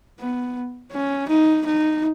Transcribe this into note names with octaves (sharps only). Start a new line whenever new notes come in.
B3
C#4
D#4
D#4